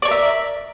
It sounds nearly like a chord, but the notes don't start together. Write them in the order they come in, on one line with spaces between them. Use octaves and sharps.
D5 C#5 A#4 E5